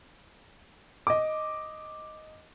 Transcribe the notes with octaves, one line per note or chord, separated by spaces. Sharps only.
D#5 D6